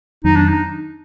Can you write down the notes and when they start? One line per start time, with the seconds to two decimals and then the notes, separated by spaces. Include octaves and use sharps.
0.24 F2 D#3 F#3 B3 D#4
0.36 D4
0.49 D#4